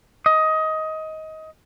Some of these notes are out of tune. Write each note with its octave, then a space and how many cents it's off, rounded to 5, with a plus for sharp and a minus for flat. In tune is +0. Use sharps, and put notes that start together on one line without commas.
D#5 +20